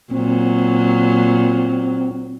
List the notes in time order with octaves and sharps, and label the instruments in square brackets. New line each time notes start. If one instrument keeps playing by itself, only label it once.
[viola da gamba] A#2 F#3 [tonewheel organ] C4